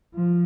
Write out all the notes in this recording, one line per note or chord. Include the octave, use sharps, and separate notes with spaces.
F3